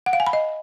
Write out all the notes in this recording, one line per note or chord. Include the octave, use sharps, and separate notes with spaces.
F#5
F5
G#5
B5
D#5